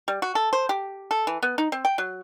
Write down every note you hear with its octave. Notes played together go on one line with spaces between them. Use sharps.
G3
F#4
A4
C5
G4
A4
E3
B3
D#4
C4
G5
F#3